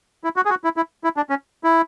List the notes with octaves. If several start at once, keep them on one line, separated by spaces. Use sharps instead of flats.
E4
F#4
G#4
F#4
E4
E4
E4
D4
C#4
E4